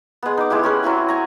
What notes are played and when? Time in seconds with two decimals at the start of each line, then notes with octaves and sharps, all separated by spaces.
0.23 G#3 B3
0.37 D#4 D6
0.50 G#3 E4 G4
0.63 C#4 A#4 B4
0.83 F#3 C4 E4 G#5
1.08 G#5 A#5